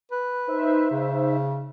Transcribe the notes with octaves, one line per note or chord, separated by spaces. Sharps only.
B4
D#4 C5 E5
C#3